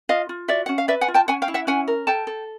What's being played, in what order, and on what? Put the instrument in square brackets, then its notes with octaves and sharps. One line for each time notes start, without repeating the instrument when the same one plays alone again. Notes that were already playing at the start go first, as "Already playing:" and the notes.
[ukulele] F4 D#5 F5
F4
F#4 D5 E5
C#4 F#5
F5
B4 D5 E5
F#5 G#5
F4
G5 A5
C#4 F#5 G#5
F5 G5
E4
E5 F#5
C#4 F#5 G#5
A#4
A4 G5 A5
A4